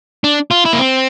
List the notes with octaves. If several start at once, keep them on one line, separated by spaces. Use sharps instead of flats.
D4
F4
E4
A#3
C4